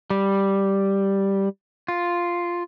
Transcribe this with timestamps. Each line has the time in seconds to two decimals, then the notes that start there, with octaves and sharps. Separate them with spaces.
0.10 G3
1.88 F4